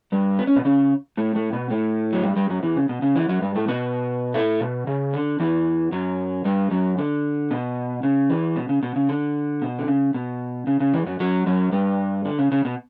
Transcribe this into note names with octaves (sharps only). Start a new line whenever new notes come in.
G2 G3
B3
C#4
B2 B3
C#3 C#4
A2 A3
A2 A3
B2 B3
A2 A3
F#3
G2 G3
G2 G3
F#2 F#3
E2 E3
C#3
B2
C#3
E2 E3
F#2 F#3
G2 G3
A2 A3
B2 B3
A2 A3
B2
C#3
D3
E2 E3
F#2 F#3
G2 G3
F#2 F#3
D3
B2
C#3
E2 E3
B2
C#3
B2
C#3
D3
B2
D3
C#3
B2
C#3
C#3
E2 E3
F#2 F#3
F#2 F#3
F#2 F#3
G2 G3
D3
C#3
C#3
B2